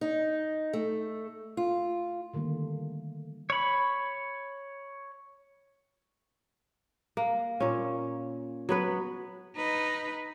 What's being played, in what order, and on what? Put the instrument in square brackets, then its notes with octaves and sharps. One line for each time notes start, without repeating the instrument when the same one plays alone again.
[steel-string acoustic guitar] D#4
A3
F4
[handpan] D3 D#3 G3 A3 A#3
[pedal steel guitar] C#5 B5
[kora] A#3
A#2 C#4
F#3 B3 B4
[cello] D#4 B4